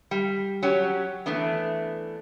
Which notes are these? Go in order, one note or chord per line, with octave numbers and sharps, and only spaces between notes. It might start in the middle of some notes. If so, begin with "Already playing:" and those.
G3
F#3 C#4 G4 C#5
E3 A3 B3 D4